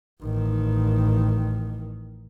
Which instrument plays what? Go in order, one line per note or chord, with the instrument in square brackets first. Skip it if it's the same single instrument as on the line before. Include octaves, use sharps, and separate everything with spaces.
[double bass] A1 D#3